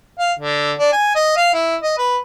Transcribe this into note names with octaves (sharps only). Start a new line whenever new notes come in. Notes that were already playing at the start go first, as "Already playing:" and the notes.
F5
D3
D4
G#5
D#5
F5
E4
D#5
B4